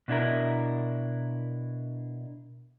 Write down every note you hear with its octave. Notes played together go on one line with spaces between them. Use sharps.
B2 D4 E4 A#4